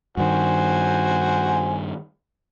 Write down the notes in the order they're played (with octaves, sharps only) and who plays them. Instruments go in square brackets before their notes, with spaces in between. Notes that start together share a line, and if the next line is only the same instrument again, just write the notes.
[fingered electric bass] G2 D#3 [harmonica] F#4 C5 G#5